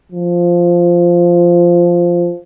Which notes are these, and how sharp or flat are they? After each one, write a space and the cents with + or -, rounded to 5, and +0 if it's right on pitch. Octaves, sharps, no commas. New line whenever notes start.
F3 -5